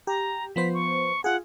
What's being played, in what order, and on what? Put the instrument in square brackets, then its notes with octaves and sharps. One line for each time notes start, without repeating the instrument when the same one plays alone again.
[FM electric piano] G4 [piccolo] A#5
[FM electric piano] F3 B3 C5 [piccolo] B6
[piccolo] C#6
[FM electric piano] F4 G#4 [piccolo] F#5